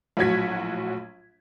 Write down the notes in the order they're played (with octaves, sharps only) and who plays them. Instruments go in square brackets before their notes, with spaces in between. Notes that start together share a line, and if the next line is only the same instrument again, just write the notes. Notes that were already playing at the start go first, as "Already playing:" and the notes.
[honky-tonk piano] A#1 A2 F#3 F#4 G#6 B6